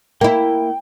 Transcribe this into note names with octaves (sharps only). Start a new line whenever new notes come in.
A#3 E4 G5